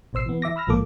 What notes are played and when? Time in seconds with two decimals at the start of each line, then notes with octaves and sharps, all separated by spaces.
0.13 A1 B2 C5 E6 C7
0.26 E3 B3
0.42 E3 E5 D6 A#6
0.56 B5 E6 F6 A#6
0.67 A#1 G#2 F3 A#3 A4 D6